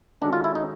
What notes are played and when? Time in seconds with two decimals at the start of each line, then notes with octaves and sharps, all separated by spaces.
0.21 D#3 G#3 C#4 D4 F#4 A4
0.33 F4
0.44 E4
0.55 D#4